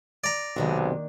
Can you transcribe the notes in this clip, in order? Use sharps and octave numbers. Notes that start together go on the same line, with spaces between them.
D5 A#5
B1 F2 C3 D#3 G#3 A#3 D4